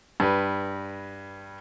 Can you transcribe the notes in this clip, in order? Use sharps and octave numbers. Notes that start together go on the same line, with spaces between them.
G2 B4